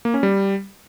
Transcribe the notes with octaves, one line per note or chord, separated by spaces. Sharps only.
A#3
C#4
G3